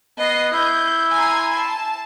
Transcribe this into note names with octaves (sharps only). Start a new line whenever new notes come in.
B3 D#5 C7
E4 G6
G#5 A#5 C6
A5